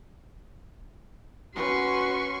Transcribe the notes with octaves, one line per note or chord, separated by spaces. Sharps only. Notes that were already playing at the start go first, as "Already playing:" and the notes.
C#4 F#4 B4 C6 C#6